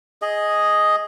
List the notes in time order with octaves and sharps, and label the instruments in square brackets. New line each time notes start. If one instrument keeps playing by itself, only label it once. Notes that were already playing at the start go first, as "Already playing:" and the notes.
[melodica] G#4 D#5